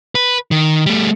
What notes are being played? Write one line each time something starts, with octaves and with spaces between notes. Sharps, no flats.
B4
D#3
G3 A3